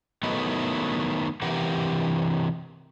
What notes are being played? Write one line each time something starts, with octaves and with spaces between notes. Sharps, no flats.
D#3 F#3 A3 B3 D#4 E4
C3 E3 G4 A#4 F#5